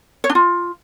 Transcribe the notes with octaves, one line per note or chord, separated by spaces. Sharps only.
C#5
D4
F4